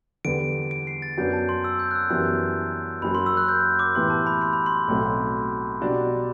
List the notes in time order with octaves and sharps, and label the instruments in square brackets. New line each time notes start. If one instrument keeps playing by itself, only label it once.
[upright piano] E2 D3 G3 B3 [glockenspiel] D7
[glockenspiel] D7
C7
A6
[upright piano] F#2 F#3 B3 D4 [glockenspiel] G6
[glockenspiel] A5
C6
E6
G6
F#6
E6
[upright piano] F#2 E3 G3 B3 E4 [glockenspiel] C6
[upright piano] F#1 F#2 F#3 [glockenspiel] B5
[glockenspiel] C6
E6
F#6
G6
D6
[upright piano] A2 E3 B3 E4 G4 [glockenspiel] C6
[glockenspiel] A5
B5
C6
B5
C6
[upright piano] B1 A2 F#3 A3 C4
B2 G3 D4 F#4